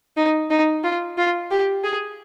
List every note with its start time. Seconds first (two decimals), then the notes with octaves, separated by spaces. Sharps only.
0.17 D#4
0.50 D#4
0.83 F4
1.18 F4
1.51 G4
1.84 G#4